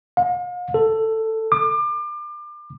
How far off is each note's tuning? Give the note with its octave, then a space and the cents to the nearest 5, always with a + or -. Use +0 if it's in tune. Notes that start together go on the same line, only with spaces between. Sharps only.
F5 +40
A4 +10
D6 +35